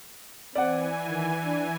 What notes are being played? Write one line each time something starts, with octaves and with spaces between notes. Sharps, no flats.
E3 C4 D5 F#5 G#5
D#3
D4